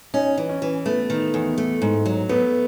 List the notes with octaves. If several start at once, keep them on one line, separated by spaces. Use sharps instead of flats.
C#4 D#4
E3
C#4
E3
A3 B3
D#3
E2
A3
G#2
F#3
A3 B3